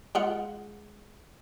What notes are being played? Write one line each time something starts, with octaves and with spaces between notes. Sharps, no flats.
G#3 F4 F#5